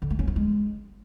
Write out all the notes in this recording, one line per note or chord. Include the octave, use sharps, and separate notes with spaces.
D3
A3
C#4
F#3
G#3